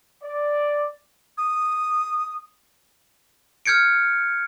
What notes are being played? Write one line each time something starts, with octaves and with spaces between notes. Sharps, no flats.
D5
D#6
F6 G6 G#6 C#7 D7